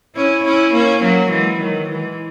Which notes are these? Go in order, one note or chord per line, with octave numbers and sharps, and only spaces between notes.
C#4 E4
C#4 E4
A#3 C#4
F#3 A#3
E3 G#3
D#3 F#3
E3 G#3